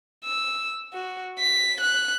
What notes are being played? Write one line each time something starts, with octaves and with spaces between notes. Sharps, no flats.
E6
F#4
B6
F#6